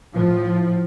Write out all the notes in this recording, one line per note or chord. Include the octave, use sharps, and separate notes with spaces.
A2 F3